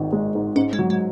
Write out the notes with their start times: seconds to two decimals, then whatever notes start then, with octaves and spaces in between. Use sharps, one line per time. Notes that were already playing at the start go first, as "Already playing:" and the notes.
Already playing: G#1 G#2 D#3
0.13 G#3
0.35 G#2
0.56 G#2 C#4
0.73 G#3
0.79 F#3
0.90 G#3